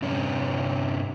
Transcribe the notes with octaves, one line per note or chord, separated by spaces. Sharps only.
G2 C3 C#4